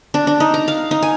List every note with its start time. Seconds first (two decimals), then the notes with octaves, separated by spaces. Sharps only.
0.14 D4
0.27 D4
0.40 D#4
0.54 A#5
0.68 F5
0.91 D#4
1.02 G#5